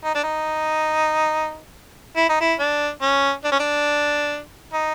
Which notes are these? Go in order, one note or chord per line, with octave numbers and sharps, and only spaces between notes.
D#4
D4
D#4
E4
D#4
E4
D4
C#4
D4
C#4
D4
D#4